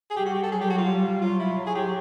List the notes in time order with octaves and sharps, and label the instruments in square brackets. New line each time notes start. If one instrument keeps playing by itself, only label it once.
[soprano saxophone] G#4
[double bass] G3 [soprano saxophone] G4
[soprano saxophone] F#4
G4
A4
[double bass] F#3 [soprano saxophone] G#4
[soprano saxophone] G4
F#4
F4
[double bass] G3
[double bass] F#3 [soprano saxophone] F4
[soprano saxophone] E4
G#4
G4